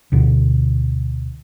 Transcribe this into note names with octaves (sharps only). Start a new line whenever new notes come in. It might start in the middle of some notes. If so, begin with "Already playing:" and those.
D2 B2 D3